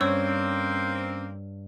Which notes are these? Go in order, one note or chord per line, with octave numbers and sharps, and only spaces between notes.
G2 A#3 C4 C#4 C#5 C#6 E6